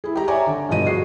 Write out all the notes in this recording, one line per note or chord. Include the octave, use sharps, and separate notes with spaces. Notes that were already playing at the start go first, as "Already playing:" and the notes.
E4 G#4
G4 A#5
C#5 D5 E5 G#5 A#5 D6
D3
G2 B2 F3 D#5 D#7
F#4 G#4 C7